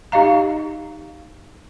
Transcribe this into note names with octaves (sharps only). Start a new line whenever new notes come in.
D#4 G4 D#5 F5 A#5